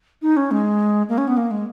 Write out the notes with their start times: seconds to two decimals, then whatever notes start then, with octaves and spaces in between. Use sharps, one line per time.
0.22 D#4
0.37 C#4
0.51 G#3
1.09 A#3
1.18 C#4
1.27 B3
1.37 A#3
1.51 G#3